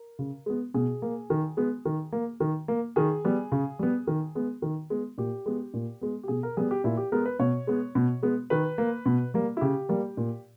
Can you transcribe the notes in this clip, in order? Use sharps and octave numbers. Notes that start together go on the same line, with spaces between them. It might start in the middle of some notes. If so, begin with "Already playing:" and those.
Already playing: A#4
C#3
G#3 B3
B2 G#4
A#3
D#3
G#3 B3
D#3
A#3
D#3
A#3
D#3 G#4
G3 B3
C#3
G3 B3
D#3
G#3 B3
D#3
G#3 B3
A#2 G4
G#3 B3
A#2
G#3 B3
G4
B2 G#4
A#4
G3 B3 G#4
G4
A#2 E4
G4
G#3 B3 A#4
B4
B2 C#5
G#3 B3
B2
G#3 B3
D#3 B4
A#3
B2
G3 A#3
E4
C#3 G4
G3 A#3
A#2